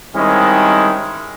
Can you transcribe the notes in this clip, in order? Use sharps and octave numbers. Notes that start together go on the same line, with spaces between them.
D#3 G3 G#3 C4 C#4 E4